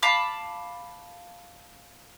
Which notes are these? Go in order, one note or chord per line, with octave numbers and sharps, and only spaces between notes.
F5 A5 B5 D6